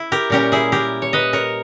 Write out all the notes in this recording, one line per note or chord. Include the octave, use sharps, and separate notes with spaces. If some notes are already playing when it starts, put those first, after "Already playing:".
Already playing: E4
G4 A#4
A#2 G3 C#4 G4 A#4
E4 G#4
G4 A#4
C#5
B4 D#5
A#4 C#5